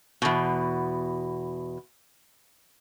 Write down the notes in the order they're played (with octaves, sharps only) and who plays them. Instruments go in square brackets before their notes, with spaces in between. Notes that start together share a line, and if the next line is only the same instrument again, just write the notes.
[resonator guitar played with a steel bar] E2 B2